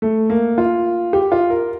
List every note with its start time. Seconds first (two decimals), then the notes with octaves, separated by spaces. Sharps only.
0.02 A3
0.30 A#3
0.58 F4
1.13 G4
1.32 F4
1.50 A#4